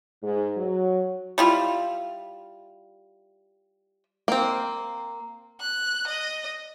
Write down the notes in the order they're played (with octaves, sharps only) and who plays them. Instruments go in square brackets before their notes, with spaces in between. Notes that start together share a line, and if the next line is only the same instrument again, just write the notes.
[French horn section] G#2
F#3
[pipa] G3 E4 F4
[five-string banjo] A#3 C4
[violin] F#6
D#5